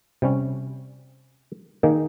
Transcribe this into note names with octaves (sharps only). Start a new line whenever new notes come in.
C3 G3 C#4
D#3 A#3 D#4 G#4